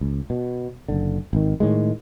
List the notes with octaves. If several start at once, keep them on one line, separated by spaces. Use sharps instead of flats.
C#2
B2
F#1 D3
G#1 D#3
A2 D#3 G#3